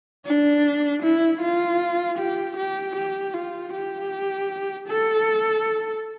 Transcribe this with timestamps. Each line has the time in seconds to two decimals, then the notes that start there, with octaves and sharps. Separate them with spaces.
0.25 D4
1.03 E4
1.41 F4
2.18 G4
2.56 G4
2.96 G4
3.34 F4
3.73 G4
4.88 A4